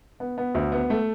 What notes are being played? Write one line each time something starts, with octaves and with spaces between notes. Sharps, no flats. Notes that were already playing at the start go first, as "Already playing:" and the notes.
B3
B3
D2
B3
A3